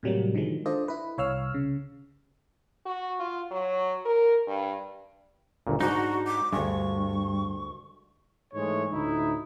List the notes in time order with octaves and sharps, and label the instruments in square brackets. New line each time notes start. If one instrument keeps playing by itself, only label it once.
[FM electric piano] A2 C3 F#3 G3 A#3
D3 D#3 F3 G#3
D4 F4 A4 C5 D5 D#5
E4 B4
C2 C#5 F5 E6 F6
C#3
[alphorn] F#4
F4
F#3
A#4
G2
[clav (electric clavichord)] G1 D2 A#2
[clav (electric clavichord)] G#2 D4 [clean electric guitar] D#4 [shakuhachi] F#4
[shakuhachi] D6
[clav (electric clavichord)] D2 G#3 [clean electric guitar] G2 [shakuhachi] C#6
[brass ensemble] G#2 E3 G#3 A3 C#5
D2 A2 D#4 E4